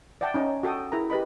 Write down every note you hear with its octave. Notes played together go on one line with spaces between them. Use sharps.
D5 E5 F#5 G5 A5
C#4 D#4 C#5 D#5
C#5
F#4 A4 G5 D#6
E4 G#4 A#4 A#5
G4 B4 D#5 B5